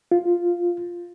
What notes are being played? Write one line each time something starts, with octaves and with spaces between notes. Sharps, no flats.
F4